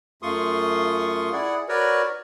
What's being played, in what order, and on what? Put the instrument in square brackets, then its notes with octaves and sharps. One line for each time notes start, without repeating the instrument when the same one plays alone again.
[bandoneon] F#2 A3 F4 C6 C#6 D#6
E4 G#4 D5 F#5
F#4 A#4 B4 C#5 D5